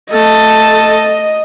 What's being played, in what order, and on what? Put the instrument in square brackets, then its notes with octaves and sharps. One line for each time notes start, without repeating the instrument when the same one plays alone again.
[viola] A3 A5 [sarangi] D#5